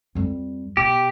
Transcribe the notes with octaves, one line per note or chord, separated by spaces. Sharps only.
F2 G3
B2 G4